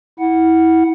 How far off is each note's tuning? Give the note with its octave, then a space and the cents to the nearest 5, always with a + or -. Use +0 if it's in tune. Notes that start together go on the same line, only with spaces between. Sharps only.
E4 -20 F#5 +0